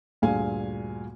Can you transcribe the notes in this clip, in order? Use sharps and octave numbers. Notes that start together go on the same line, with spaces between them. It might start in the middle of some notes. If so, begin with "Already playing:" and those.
D2 G2 A#2 G#4 F5 G#5